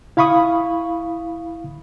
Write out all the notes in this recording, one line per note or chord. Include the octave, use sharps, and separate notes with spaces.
E4 F5 B5 C#6 D#6